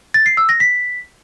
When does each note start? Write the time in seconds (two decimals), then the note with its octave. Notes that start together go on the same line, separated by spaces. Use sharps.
0.14 A6
0.26 C7
0.37 E6
0.49 A#6
0.60 B6